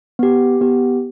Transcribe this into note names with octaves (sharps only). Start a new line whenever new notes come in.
B3 G4
B3 G4